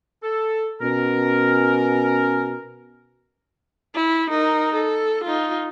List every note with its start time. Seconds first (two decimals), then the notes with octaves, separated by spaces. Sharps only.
0.23 A4
0.82 B2 C#4 A#4
3.95 E4
4.30 D#4 A#4
4.75 A4
5.24 D#4 F4